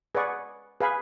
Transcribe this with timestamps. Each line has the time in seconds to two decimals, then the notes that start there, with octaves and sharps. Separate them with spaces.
0.15 G#4 B4 D5 F#5 C#6
0.80 G#4 B4 F5 G#5 B5